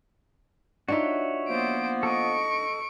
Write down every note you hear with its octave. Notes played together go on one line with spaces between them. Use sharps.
D4 D#4 F4 F#4 C#5 E5
F3 A#3 B3 C5 D7
A4 D#5 C#6 D7